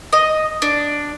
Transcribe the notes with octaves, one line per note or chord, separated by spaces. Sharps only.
D#5
D4